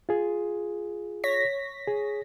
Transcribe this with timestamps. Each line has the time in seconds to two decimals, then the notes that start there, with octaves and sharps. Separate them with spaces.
0.09 F4 G#4
1.24 C#5 A#6 B6
1.87 G#4